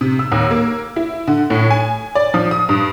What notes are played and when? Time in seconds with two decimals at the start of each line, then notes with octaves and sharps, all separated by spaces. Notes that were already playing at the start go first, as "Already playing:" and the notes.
0.01 C3
0.19 E6
0.32 D#2
0.51 A#3
0.96 E4
1.27 D3
1.50 A2
1.71 G#5
2.15 D5
2.34 F3
2.51 D#6
2.69 G2